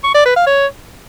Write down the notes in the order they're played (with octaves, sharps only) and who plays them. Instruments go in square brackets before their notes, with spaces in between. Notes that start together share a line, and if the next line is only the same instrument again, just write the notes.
[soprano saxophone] C#6
D5
B4
F5
C#5